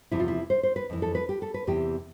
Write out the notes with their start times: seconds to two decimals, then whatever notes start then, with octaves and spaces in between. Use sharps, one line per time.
0.11 E2 C3 F3 E4
0.20 F4
0.28 E4
0.50 C5
0.63 C5
0.76 B4
0.90 F2 E3
1.02 A4
1.15 B4
1.29 G4
1.42 A4
1.54 B4
1.67 E2 C3 E3 G4